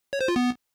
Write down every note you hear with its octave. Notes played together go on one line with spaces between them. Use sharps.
C#5
C5
F4
B3